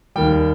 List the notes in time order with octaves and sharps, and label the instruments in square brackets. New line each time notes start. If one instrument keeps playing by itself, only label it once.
[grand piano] D#2 D#3 G3 G5